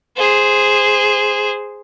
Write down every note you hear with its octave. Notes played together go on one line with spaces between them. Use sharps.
G#4 C5